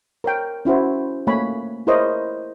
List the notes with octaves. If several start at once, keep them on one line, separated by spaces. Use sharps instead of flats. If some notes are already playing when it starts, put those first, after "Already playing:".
A#4 C#5 G5
C#4 E4 F#4 C5
A3 A#3 C#5 G#5 B5
E4 G#4 A#4 C5 C#5 D#5